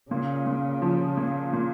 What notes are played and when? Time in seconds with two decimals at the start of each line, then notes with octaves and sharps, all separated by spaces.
0.11 A#2 C#3
0.46 A#2
0.82 F3
1.17 A#2
1.53 A#2